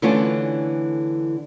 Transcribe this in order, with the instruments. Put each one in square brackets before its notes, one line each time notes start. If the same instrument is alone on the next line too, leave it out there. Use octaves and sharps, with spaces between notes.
[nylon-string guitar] D3 E3 A3 C#4 D4 F4